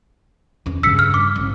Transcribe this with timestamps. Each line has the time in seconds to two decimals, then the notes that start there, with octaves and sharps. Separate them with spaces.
0.66 E2 C#4
0.83 G2 C#3 E6 B6 C#7
0.99 F6
1.14 D6
1.36 G#1